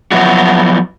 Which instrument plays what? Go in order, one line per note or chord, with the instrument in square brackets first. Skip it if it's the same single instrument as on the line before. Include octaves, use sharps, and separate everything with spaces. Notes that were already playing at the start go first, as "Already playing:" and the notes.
[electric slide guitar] F3 F#3 B3 E4 F#4